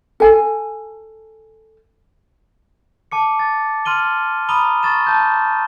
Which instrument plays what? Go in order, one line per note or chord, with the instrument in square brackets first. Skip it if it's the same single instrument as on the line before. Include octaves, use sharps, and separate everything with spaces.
[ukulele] A4 G#5
[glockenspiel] A5 D6 C#7
A6
C6 F6 D#7 G7
A#5 B5 D#6 D#7 G7
C#6 A6 E7
A5 G6